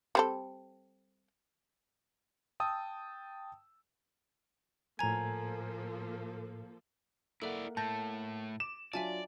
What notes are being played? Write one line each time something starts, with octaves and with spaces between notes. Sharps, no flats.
G3 C4 A4
G5 A5 D#6 E6
A2 F3 A#3 A4 G#5 A#5 G#6
A#3 E4 A4 D5 E5 F#5
A2 A3 A5 G6 A#6
D6 E7
F#3 D4 F4 D5 E5 G#5 A5